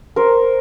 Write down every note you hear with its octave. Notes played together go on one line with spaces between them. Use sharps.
A#4 C5